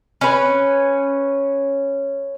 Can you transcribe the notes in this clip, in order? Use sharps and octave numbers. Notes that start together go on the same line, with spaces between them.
C#4 B4